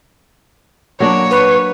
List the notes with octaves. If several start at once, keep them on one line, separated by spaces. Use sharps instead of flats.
F#3 A#3 D4 C#5
B4